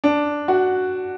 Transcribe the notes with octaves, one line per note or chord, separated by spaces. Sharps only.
D4
F#4